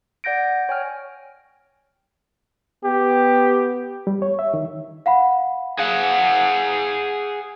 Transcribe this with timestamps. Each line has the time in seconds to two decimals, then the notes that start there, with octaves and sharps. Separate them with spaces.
0.24 D5 F#5 G6 A#6 D7
0.69 C#5 G5 G#5 F6
2.84 B3 G4
4.07 G3
4.22 C#5
4.39 E5
4.54 D#3
5.06 F5 F#5 B5
5.79 G#4 F5 F#5